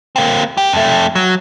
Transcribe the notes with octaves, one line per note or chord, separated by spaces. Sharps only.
A#3 C4
G4
F2 A3
F#3